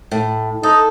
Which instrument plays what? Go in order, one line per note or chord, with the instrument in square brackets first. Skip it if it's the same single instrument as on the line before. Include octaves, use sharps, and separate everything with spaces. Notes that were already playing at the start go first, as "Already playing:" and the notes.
[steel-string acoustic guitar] A2
[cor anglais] D#4 [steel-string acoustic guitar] A4